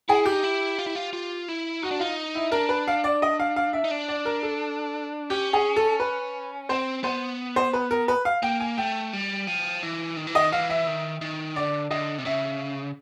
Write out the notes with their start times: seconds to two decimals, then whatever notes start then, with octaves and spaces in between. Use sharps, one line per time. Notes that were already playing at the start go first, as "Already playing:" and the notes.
0.09 E4 G#4
0.26 G4
0.32 D#4
0.43 E4
0.79 F4
0.87 E4
0.95 F4
1.13 F4
1.48 E4
1.82 D#4 F#4
1.91 D4
2.00 D#4 F4
2.35 E4
2.52 D4 A#4
2.69 B4
2.88 F5
3.04 D5
3.22 D#5
3.40 F5
3.56 F5
3.73 E5
3.84 D#4
3.91 D4
4.08 D5
4.25 A#4
4.43 A4
5.30 C#4 G4
5.53 G#4
5.76 A4
6.00 B4
6.69 C4 C5
7.04 B3 C5
7.56 C5
7.73 B4
7.91 A#4
8.08 B4
8.25 F5
8.43 A#3 G5
8.60 G#5
8.77 A3 G5
9.13 G3
9.47 F3
9.83 E3
10.17 D#3
10.27 E3
10.35 D#3 D#5
10.52 E3 F5
10.70 E5
10.87 D#3
11.21 D#3
11.56 D3 D5
11.91 D3 D#5
12.18 C3
12.25 C#3 E5